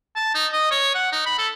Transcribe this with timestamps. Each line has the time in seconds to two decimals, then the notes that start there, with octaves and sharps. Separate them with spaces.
0.16 A5
0.35 D#4
0.53 D#5
0.71 C#5
0.95 F#5
1.12 D#4
1.26 B5
1.38 A4